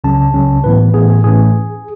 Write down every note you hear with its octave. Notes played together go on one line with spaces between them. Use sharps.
C#2 C#3 F#3 C#4 A5
C#2 C#3 F#3 C#4
A2 E3 B3 B4
A2 E3 B3 G#4
G#4
A2 E3 A3 C#4 G#4